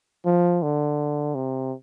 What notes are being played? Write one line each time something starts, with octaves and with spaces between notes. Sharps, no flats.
F3
D3
C3